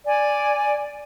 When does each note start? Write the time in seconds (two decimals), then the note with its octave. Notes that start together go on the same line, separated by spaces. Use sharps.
0.06 D5 G#5